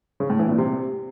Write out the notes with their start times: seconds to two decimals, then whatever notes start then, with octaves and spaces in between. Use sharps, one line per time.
0.20 C#3
0.30 A2
0.39 E3
0.49 A#2
0.58 C3